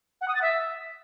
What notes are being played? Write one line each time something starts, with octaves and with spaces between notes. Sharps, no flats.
F#5
D#6
A6
E5